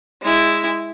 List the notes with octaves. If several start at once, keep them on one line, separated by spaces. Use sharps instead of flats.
G#3 E4